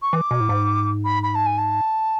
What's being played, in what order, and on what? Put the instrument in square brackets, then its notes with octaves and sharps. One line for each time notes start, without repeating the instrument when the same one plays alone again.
[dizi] C#6
[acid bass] E3 [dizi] D6
[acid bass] B2
A2
G#2
[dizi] B5
B5
A5
G#5
A5